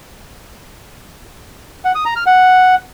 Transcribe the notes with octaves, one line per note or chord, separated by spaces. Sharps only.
F#5
D#6
A#5
F6
F#5